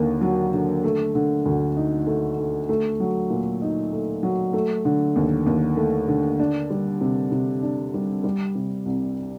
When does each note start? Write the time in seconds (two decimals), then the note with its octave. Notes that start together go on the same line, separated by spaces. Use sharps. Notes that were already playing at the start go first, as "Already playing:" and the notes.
Already playing: D#2 D3 A#3
0.21 F#3
0.53 D3
0.84 A3
1.15 D3
1.46 D2
1.77 D#4
2.07 A3
2.38 D3
2.69 A3
3.00 F#3
3.30 A#2
3.62 D#4
3.92 A3
4.23 F#3
4.53 A3
4.85 D3
5.16 D#2
5.46 D#2
5.77 A3
6.08 D3
6.39 D4
6.70 G3
7.01 C3
7.32 C3
7.63 D4
7.94 G3
8.24 G3
8.55 C3
8.86 C2